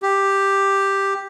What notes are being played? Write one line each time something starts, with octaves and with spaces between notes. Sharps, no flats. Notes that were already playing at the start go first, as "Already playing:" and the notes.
G4